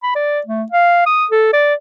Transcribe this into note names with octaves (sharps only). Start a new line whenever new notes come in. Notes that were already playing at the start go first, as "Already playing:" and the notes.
B5
D5
A3
F5
D#6
A4
D5